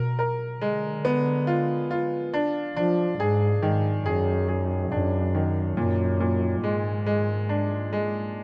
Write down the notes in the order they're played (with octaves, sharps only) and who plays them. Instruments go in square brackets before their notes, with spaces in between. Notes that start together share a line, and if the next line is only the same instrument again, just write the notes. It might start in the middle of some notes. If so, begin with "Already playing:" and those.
Already playing: [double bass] B2 [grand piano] A#4
[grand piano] A#4
[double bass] D3 [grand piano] G#3
[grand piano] B3
F4
F4
D4
[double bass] F3 [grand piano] D4
[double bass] G#2 [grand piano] G#4
[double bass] G#2 [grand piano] D#3
[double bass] F#2 [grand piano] G#4
[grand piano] G#4
[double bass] F#2 [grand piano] D4
[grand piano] D#3
[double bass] F#2 [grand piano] A#2
[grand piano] A#2
[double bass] G#2 [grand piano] G#3
[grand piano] G#3
D4
G#3